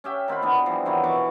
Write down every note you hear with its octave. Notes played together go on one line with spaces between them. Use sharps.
C#4 G4 E5 G5
D#3 C4 F4 B5
E3 B3 C4 D4
E3 F3 G3
D#3 E3 F#3 C4
B2 E3 C#6 D6